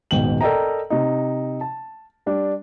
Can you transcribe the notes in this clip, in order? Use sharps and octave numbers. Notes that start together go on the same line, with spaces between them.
D#1 G#2 B2 G5 F#7
A4 A#4 D5 D#5 G5 A#5
C3 D#4
A5
G3 D4